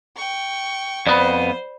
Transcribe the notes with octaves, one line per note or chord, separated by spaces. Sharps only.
G5 C#6
F2 B3 C5 D5 B5